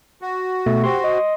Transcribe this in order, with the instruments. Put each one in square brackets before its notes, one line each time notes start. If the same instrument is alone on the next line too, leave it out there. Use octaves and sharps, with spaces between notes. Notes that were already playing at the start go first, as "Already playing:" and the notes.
[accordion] F#4
[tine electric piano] B2 A3
[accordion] C4 F#4 [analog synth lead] G4 [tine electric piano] C6
[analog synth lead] D#5